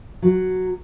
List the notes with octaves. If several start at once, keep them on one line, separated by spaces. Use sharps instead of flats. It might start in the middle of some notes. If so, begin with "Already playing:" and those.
F#3